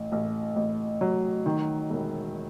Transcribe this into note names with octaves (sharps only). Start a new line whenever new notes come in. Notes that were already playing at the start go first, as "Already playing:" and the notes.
Already playing: A1
A1
A1
F#3
D#3
E1